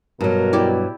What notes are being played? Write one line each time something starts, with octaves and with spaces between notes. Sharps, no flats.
G2 B2 F#3 A#4
E4 G4 D5